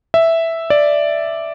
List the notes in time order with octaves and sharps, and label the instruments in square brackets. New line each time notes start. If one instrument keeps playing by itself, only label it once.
[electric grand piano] E5
D5